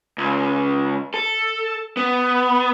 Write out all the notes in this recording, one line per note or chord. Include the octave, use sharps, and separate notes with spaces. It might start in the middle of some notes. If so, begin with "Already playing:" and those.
C#2
A4
B3